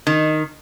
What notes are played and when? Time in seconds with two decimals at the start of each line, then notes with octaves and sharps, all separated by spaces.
0.07 D#3